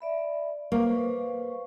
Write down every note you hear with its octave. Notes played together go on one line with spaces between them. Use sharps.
D5 E5 B5
A#3 B4 C5 C#6